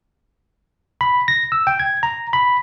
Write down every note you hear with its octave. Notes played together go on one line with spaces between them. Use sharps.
B5
A#6
E6
G5
G#6
A#5
B5